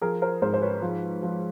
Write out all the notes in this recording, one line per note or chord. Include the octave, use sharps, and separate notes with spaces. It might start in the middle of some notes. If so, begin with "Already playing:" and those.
F3 G#4 A#4
A#4 C5
G#2 A#4 C5
C5
B4 C#5
F3
F3